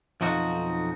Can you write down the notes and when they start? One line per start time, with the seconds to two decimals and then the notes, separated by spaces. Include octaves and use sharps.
0.21 B1 F2 F3 D#4 F#4